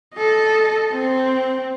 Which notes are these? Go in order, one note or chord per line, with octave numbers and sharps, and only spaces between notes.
A4 D#5
C4